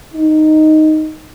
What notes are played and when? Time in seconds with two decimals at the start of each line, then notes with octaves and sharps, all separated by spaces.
0.14 D#4